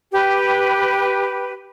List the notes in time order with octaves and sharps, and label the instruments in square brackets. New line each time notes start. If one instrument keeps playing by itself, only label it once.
[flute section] G4 B4